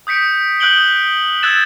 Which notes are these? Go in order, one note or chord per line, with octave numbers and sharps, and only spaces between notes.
D#6 G6 B6 C#7 D7
D#6 F#6 G6 D7 F#7 G7
E6 F#6 G#6 A6 E7